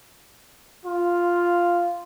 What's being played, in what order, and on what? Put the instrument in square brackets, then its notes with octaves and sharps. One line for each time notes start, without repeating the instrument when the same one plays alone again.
[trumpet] F4